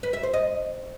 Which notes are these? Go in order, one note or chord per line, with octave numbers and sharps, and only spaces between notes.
B4
E5
C5
D#5